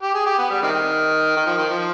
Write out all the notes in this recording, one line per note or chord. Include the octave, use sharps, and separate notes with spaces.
G4
G#4
G4
B3
G3
C3 D#3
D#3
F3
D#3
F3